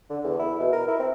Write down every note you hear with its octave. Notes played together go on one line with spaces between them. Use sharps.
D3
E2
E4
B2
A#4
E4
C4